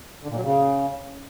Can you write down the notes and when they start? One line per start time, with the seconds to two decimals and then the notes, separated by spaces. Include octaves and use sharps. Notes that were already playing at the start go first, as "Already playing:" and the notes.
0.23 D3
0.30 A#2
0.37 F#3
0.43 C#3